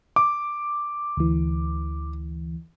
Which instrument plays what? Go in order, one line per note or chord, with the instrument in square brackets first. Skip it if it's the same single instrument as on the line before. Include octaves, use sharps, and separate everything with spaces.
[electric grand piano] D6
[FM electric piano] D2 E3